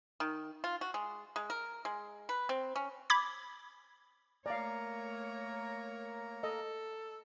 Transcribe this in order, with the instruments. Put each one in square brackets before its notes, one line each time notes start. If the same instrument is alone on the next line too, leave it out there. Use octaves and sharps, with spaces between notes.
[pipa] D#3
F4
F#4
G#3
G#3
A#4
G#3
B4
C4
C#4
[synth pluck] B5 D6 G#6 B6
[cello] A3 C#5 [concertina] A#3 A#4 A#5 [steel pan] D5 F5
[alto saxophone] A4 [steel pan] D#5